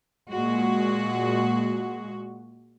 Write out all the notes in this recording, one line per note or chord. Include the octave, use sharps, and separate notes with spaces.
A#2 G#3 F#4